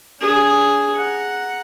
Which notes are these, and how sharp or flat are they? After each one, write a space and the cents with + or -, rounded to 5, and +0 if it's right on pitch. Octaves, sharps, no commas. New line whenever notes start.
D4 -40 G#4 +0
F#5 +0 A#5 +0